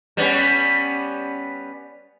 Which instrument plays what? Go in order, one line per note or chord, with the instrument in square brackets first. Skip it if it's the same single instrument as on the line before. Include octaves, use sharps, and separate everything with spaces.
[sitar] G3 B3 C#4